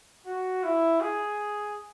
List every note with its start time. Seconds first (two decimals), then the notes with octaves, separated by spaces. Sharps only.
0.26 F#4
0.64 E4
1.01 G#4